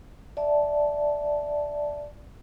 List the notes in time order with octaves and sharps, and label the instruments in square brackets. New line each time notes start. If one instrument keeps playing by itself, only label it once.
[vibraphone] D5 E5 A5